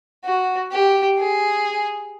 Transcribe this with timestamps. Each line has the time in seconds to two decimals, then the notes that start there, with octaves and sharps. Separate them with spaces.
0.25 F#4
0.71 G4
1.19 G#4